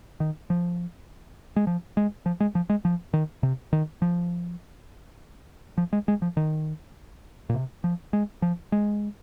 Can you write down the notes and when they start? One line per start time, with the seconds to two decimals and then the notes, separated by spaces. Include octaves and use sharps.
0.20 D#3
0.50 F3
1.56 G#3
1.67 F3
1.97 G#3
2.26 F3
2.40 G#3
2.55 F3
2.69 G#3
2.85 F3
3.13 D#3
3.43 C3
3.73 D#3
4.02 F3
5.78 F3
5.93 G#3
6.08 G#3
6.22 F3
6.37 D#3
7.49 A#2
7.54 C3
7.84 F3
8.13 G#3
8.42 F3
8.72 G#3